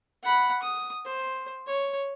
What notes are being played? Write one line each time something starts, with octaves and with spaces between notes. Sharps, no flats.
F#5 B5
D#6
C5
C#5